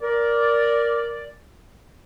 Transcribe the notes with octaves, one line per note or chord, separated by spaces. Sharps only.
A#4 D5